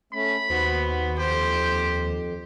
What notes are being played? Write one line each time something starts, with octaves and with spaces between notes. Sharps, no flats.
A3 C#4 B5
D#2 B3 F#4 C5
F2 G4 C5